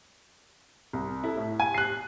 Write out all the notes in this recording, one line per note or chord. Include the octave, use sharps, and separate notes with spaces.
C2
E4 A4
A2
G#5
F#6 C7